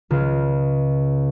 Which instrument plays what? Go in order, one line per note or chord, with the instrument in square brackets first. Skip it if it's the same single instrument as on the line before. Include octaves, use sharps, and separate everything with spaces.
[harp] C#2 C#3